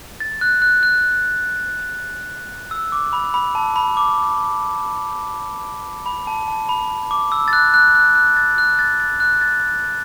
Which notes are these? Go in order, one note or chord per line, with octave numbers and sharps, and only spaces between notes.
A6
F#6
F#6
F#6
E6
D6
B5
B5
A5
B5
D6
B5
A5
A5
B5
D6
E6
A6
F#6
F#6
F#6
F#6
A6
F#6
A6
A6
F#6
A6